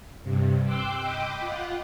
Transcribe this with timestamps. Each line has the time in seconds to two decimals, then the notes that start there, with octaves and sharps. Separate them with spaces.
0.23 G2 C3
0.64 G5 C6 D6 E6 F#6 G6
0.99 D#5 G5 B5 D6
1.40 F4 F#5